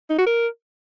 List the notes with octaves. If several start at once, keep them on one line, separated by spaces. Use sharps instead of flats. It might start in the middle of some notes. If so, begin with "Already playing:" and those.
D#4
F#4
A#4